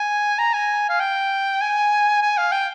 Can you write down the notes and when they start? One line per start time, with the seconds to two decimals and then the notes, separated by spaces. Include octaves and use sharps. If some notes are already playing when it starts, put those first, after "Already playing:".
Already playing: G#5
0.39 A#5
0.54 G#5
0.89 F5
1.00 G5
1.62 G#5
2.22 G#5
2.38 F5
2.52 G5